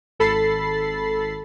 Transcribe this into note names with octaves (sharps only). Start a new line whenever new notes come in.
G#1 A4 B5 A6 C7